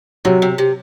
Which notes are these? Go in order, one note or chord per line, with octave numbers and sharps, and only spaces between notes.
C3 F#3
C3
C3